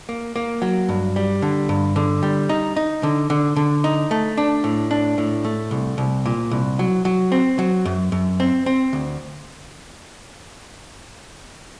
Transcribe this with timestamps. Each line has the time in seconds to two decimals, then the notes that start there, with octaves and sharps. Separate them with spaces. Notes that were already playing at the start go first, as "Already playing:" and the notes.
0.09 A#3
0.36 A#3
0.62 F#3
0.89 G2
1.16 G3
1.42 D3
1.69 G2
1.96 D3
2.23 G3
2.49 D#4
2.76 D#4
3.03 D3
3.30 D3
3.56 D3
3.84 D#4
4.11 A3
4.37 D4
4.64 A2
4.91 D4
5.18 A2
5.45 A3
5.71 C2
5.98 C2
6.26 A#2
6.51 C2
6.79 F#3
7.05 F#3
7.32 C4
7.59 F#3
7.85 F#2
8.12 F#2
8.40 C4
8.66 C4
8.93 D2